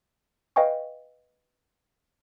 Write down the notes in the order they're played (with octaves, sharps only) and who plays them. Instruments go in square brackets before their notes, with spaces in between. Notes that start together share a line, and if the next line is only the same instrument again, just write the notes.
[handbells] B4 D#5 F5 G5 G#5 C#6